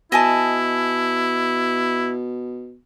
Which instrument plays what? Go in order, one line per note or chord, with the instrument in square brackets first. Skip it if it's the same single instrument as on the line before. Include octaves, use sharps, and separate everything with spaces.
[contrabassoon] B2 [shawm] E4 [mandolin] D#5 G#5 A5